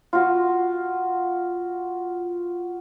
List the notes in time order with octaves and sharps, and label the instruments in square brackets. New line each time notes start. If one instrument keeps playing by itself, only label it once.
[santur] F4 F#4